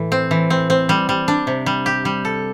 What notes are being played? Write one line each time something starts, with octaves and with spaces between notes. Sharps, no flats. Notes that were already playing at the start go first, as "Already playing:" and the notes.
Already playing: A2 E3
C4
E3
C4
C4
G3
G3
D4
C3
G3
G4
G3
A4